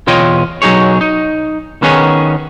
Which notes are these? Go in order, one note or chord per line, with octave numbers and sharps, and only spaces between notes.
E2 B2 F4 C#5 D#5 G5
B1 F#3 D#4 G#4 C#5
D#4
D#3 B3 C#4 D#4 G#4 C#5